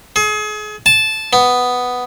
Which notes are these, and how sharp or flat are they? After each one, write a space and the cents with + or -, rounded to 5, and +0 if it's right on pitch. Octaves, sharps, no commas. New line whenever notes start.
G#4 +35
A5 -10
B3 +5